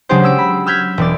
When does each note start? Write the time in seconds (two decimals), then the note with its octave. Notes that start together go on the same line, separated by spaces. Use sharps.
0.09 C#3 F#3 G#3 D4 G4 C5
0.23 C#4 E6 D7
0.38 B5
0.66 E6 F6 G6 G#6 B6
0.98 E1 D5